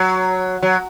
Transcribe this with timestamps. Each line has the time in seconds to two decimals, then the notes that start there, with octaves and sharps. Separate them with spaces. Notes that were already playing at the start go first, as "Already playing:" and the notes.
Already playing: F#3
0.63 F#3